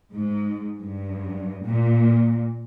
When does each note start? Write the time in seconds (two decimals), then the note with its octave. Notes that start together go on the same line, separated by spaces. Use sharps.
0.13 G#2
0.79 G2
1.65 A#2